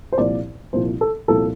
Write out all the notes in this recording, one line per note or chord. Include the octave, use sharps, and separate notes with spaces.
C5
C2 A#2 F3 D5
C2 A#2 F3 C5
A4
C2 A#2 F3 A4